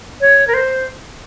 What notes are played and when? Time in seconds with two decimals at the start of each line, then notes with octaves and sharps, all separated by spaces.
0.21 C#5
0.47 A#4
0.54 C5